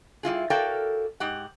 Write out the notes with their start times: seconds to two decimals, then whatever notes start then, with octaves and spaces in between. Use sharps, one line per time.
0.23 G3 E4 F4 G#4
0.50 F#4 A4 A#4 D5 F5 G5
1.20 G#2 G4 F#5